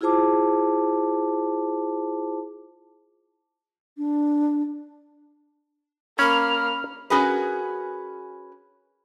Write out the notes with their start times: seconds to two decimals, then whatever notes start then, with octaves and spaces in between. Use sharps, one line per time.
0.01 E4 F4 G#4 C5 A5 D6
3.98 D4
6.19 A#3 C#4 B5 F6
7.10 C#4 F#4 G#4 A#4 B4